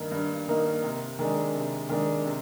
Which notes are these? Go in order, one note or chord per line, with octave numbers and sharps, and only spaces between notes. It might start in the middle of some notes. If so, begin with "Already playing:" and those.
Already playing: G2 D#3 A#3 D#4
G2
D#3 A#3 D#4
C3
D#3 G#3 D4
C3
D#3 G#3 D4
C3